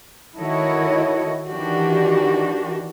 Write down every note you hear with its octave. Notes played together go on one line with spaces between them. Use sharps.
D#3 E4 F#4 A4 C#5 D#5
D#3 E3 D4 F#4 G4